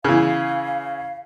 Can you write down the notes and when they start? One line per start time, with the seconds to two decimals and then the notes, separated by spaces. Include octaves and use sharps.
0.04 C#3 E3 F5